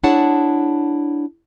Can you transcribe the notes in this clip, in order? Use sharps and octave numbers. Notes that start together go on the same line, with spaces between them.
D4 E4 G#4 C#5 F#5 A5